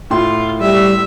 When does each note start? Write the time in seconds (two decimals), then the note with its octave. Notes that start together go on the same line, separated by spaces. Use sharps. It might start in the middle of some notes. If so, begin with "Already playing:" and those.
0.11 A2 F4 C6
0.61 G3 E5